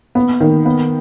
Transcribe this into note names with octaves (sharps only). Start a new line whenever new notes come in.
B3
D#3
B3